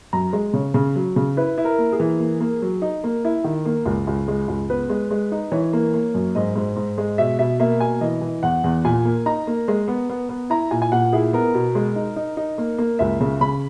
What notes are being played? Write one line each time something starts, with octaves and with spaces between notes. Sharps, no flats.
F#2 A#5
G#3
C#3 C#5
C#3
F#3
C#3
E4 B4
E4
A#4
A#3
G#4
E3
A#3
A#3
F#3
D#4
A#3
E4
D#3
A#3
C#2
C#2
G#3
C#2
B3 B4
G#3
G#3
D#4
E3 C#5
A#3
A#3
F#2
G#2 D#5
G#2
G#2
G#3
B2 E5
B2 E5
A#3 E5
B2 G#5
E3 D#5
E3
E2 F#5
E2
A#2 G#5
A#3
D#4 A#5
A#3
G#3
B3
B3
B3
E4 A#5
A#2 G#5
G#5
A#2 F#5
E4 G#4
B3 A#4
B2
G#3
D#4
D#4
D#4
A#3
A#3
C#2 E5
C#3
C#3 B5